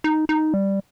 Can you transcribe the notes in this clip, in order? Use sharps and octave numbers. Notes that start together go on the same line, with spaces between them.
D#4
D#4
G3